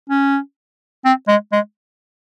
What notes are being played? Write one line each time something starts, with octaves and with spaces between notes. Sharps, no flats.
C#4
C4
G#3
G#3